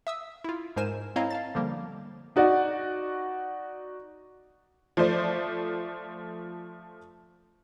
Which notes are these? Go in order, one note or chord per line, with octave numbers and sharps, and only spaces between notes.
E5 D#6 E6
E4 F4
G#2 G#3 A#4 C5 G#5 E7
C4 E4 C#5 D#5 F5 A#5
F5 A5 A6
D3 F3 G3 A#3
D#4 F#4 D5
F3 A3 C5 D5